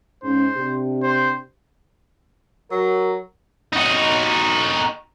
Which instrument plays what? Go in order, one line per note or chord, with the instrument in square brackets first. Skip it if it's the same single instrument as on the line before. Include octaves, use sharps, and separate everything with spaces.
[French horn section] G#2 C#4 [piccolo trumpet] C5
[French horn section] C3 D4 G4
[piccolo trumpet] C5
[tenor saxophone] F#3 [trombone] A#4
[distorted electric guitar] D#4 F#4